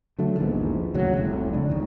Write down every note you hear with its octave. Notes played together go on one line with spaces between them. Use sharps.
D3 F#3 A3
D#1 A#1 E2 G#2
D#2 A2 C#3 F#3
F1 C2 A2
C#2 D4
D#1 D#3